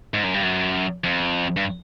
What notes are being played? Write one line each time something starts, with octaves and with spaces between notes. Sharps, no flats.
G#2
F#2
G2
F#2
F2
G2